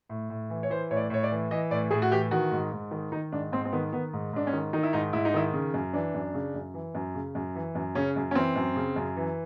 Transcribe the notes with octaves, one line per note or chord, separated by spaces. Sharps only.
A2
A2
E3
C#5
E3 C5
A2 C#5
D5
A2 C#5
D5
E3
E3 D#5
A2 D5
A2 G#4
F#4
E3 G4
D#3 F#4
G#2
G#2
D#3
D#3 D#4
G#2 D4
G#2 C4
C4
D#3 B3
D#3 B3
G#2
G#2 D4
C#4
D#3
D#3 D#4
E4
G#2 D#4
G#2 E4
D#4
D#3 E4
C#3
F#2
E3 D4
F#2
C#3
F#2
E3
F#2
C#3
F#2
E3
F#2
C#3 C#4
F#2
C#4
E3 C4
F#2
C#3
F#2
E3